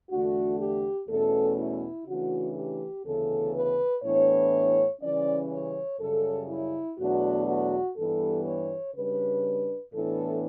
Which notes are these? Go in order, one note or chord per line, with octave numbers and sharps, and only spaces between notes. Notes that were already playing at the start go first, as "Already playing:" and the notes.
E2 D3 A3 D4 F#4
G4
E2 B2 A3 C#4 A4
E4
C#3 E3 A3 D4 F#4
G4
D2 C#3 E3 B3 A4
B4
A2 E3 B3 D4 C#5
C#3 E3 G3 C#4 D5
C#5
F#2 C#3 G3 A4
E4
E2 B2 F#3 A3 D4 F#4
F#4
G2 E3 G3 B3 A4
C#5
C#3 G3 D4 B4
A2 E3 B3 D4 A4